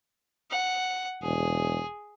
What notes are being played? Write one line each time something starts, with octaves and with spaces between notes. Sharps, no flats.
F#5
E1 G#4